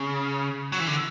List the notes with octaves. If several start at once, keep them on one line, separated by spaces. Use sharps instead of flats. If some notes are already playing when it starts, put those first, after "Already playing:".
Already playing: C#3
F#3
E3
D3